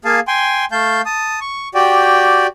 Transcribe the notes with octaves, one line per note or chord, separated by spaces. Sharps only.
A#3 G#4 F5 A5
G5 G#5 C6
A3 F5 A5 G6
A5 D#6
C#6
F#4 G4 D5 G5